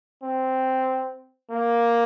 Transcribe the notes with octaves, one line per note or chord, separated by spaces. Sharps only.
C4
A#3